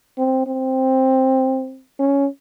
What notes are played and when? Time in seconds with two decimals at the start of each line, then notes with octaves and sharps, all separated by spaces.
0.18 C4
0.47 C4
1.99 C#4